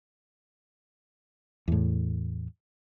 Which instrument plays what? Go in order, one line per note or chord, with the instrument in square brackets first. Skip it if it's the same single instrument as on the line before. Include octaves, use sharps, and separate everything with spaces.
[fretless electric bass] E2 A2